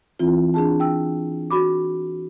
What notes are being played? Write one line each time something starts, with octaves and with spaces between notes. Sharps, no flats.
E3 C4 E4 F4
D4 G#4 A5
G5 E6
F#4 B5 D6